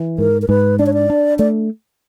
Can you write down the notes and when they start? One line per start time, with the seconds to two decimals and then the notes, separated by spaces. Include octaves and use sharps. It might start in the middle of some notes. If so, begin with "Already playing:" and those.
Already playing: E3
0.18 G#2 A#4
0.42 A#4
0.49 G#2 B4
0.79 D4 D5
0.86 C#5
0.94 D5
1.10 D4
1.39 A3 D5